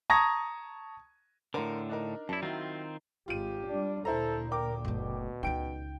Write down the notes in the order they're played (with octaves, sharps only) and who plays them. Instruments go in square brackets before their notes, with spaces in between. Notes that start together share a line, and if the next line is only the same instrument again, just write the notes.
[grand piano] A5 A#5 C#6 D#6 G#6 A#6
[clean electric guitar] A2 D3 [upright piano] A#4 C5
[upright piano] D4 D#4 A#4
[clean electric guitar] F#2 E4 [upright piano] D5 A5
[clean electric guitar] D#3 C4 F4 [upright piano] F#3 E4
[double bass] G#1 G#2 [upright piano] F4 D#7 [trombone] G4
[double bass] G3 D4
[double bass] D2 A#2 [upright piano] E4 C5 A#5 [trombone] A4
[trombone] A#4 [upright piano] G5 D6
[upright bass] F#1 A3 [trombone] B2
[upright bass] C#2 D#4 [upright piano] G5 D7